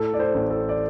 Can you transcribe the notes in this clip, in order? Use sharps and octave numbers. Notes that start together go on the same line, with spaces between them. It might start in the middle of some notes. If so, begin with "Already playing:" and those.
Already playing: A2 A4
D5
C5
A1
A4
D5